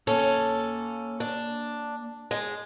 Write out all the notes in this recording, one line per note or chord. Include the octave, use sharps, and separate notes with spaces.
A#3 C#4 A4 C#5
D4
G#3